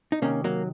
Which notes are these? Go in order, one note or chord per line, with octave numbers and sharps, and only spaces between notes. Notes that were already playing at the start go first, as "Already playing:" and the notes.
D#4
C3 D#3 A#3 C#4
F#3 A#3